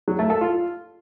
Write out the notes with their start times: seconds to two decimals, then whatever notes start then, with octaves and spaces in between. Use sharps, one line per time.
0.08 F#3
0.19 A3
0.30 A4
0.41 F4